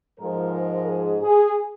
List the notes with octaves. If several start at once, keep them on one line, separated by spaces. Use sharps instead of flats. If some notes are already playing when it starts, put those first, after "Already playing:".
G#2 F3 G#3 A#4
A#4
G#4
G#4